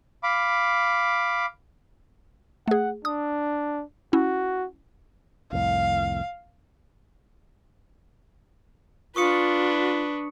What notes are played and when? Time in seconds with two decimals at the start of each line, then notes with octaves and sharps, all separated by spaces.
0.23 F5 B5 D6
2.68 A3 G#4 F#5
3.05 D4 D#6
4.13 C#4 E4 F#4
5.53 C2 F2 A2 F5
9.16 D4 F4 B4 C#6 D#6 C#7